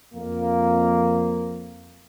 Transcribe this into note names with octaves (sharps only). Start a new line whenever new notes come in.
F2 A#3